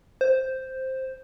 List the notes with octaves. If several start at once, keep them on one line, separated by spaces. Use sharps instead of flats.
C5